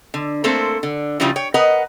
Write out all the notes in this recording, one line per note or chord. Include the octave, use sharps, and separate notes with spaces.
D3
A3 A#3 C4 A4 C5
D3
C#3 F3 G3 C#4 E4 F4
C#5 G5
A#4 B4 D#5 F#5